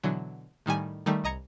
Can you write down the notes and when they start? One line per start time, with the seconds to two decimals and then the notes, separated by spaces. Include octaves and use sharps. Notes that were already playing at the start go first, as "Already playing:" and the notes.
0.03 B2 D3 E3 F#3
0.66 A2 D#3 G3 G#5
1.06 D#3 G3 A3
1.24 C2 D#5 A#5 G#6 C#7